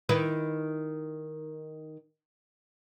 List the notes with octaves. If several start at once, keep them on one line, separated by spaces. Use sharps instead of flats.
D#3 E4 B4